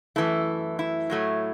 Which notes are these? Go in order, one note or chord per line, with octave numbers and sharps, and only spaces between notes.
F#2 E3 A3 E4
E4
A2 F#3 A3